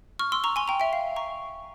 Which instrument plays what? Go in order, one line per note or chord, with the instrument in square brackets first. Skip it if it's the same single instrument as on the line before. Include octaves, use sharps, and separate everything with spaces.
[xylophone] C#6 F6
C6 E6
A#5 C#6
G#5 C6
G5 A#5
E5 G5
F5
A#5 C#6